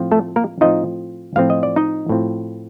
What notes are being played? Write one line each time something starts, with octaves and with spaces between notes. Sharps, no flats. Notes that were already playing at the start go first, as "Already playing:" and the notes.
Already playing: A2 F3 C4 F4
A3 A4
A#3 A#4
A2 F3 C4 D#4 F4 D#5
A2 F3 C4 F4 F5
D#5
D5
D#4 D#5
A2 F3 C4 F4